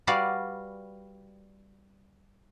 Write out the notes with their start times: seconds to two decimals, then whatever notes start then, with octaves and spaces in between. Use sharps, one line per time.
0.07 G3 F#4 B4 D5 F5